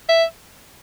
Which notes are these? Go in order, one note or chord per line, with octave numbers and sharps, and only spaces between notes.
E5